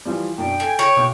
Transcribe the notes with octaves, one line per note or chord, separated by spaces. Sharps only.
E3 F3 G3
F#2 B2 D4 G5
A4 G#5
C#5
B1 B2 D6